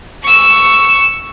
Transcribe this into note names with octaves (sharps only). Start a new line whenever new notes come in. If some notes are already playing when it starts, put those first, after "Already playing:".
C#6 E6